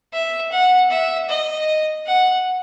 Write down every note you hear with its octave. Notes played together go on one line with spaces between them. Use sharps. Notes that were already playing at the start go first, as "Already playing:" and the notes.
E5
F#5
E5
D#5
F#5